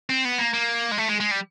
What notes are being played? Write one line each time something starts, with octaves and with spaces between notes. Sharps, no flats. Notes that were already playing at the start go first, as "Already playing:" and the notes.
C4
B3
A#3
A#3
G#3
A3
G#3
G#3
G3